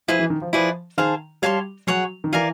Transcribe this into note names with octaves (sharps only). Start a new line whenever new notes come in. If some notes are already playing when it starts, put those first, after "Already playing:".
F3 E4 G#4 B4
E3
D#3
F3
F3 E4 G#4 B4 D5
D#3 G#4 C5 F5 A5
G3 C#5 F5 A5 C6
F#3 G#4 C#5 F#5
D#3
E3 A#4 D5 F5 G#5